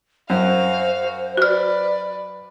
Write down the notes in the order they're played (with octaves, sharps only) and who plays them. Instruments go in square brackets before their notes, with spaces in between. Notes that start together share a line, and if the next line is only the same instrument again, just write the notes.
[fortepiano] F#2 [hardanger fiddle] F#4 F5 [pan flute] C5
[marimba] F#4 F6 [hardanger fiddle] B4 D5